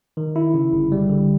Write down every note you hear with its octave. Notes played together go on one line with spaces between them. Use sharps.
D#3
E4
C#3
G1
G3
D3